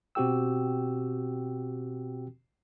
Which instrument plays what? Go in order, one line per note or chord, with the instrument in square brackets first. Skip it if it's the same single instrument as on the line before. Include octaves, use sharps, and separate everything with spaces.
[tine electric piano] B2 C4 F#4 G4 G5 E6